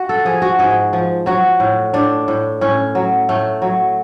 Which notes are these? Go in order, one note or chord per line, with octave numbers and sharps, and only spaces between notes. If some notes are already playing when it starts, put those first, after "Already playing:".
Already playing: F#4
A4
F3 G#4
F#4
G#2 G#4
F3
F#3 F#4
A2
A2 D4
A2
A2 C#4
F#3
A2 A3
F#3